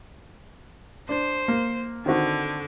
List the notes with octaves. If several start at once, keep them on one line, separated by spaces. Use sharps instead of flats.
D4 C5
A#3
D3 D#3 C4 F#4